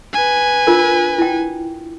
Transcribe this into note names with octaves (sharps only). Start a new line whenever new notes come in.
B4 G#5
D4 F4 A#4
E4 G5